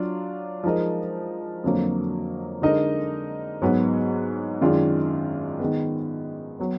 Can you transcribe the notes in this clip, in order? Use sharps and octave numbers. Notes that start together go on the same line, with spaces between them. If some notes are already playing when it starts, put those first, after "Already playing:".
Already playing: F#3 D4 F4
F3 G#3 D#4 A#4 D#5
F2 D3 F#3 A#3
D3 G#3 D#4 A#4 D#5
G#2 F#3 B3
F#2 D#3 G#3 D4 F4
D#3 G#3 B3
F#3 B3